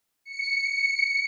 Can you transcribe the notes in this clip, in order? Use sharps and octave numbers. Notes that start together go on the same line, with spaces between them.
C#7